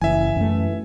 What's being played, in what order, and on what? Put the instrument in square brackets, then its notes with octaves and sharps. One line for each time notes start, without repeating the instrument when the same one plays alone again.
[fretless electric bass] F#1 [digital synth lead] E3 [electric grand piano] E5 G#5
[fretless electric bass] F#2 A3